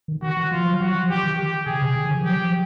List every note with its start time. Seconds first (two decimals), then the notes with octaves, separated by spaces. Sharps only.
0.08 D#3
0.22 D#3 F#4
0.37 E3
0.51 F3 F4
0.66 F#3
0.81 F#3 F#4
0.95 F3
1.09 E3 G4
1.24 D#3
1.38 G4
1.66 C#3 G#4
1.82 C3
1.96 D3
2.06 D#3
2.15 F3
2.24 F#3 G4
2.38 F3